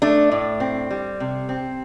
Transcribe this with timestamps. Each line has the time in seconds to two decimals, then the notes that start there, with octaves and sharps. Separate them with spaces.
0.02 A3 D4
0.32 A2
0.60 C4
0.91 G3
1.20 C3
1.49 C4